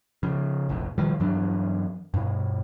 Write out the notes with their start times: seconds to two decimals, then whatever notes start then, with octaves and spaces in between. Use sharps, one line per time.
0.23 C#3 F3
0.69 F1 A#1 F2
0.98 B2 D#3 F3 G3
1.20 G2 E3 F#3 D4
2.14 G2 B2